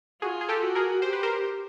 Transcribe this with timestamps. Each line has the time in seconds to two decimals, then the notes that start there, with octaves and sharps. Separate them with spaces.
0.22 F4 F#4 G#4
0.41 G#4
0.49 G4 A4
0.62 F#4
0.75 G#4 A#4
1.02 G4 C5
1.13 B4
1.23 A#4 C5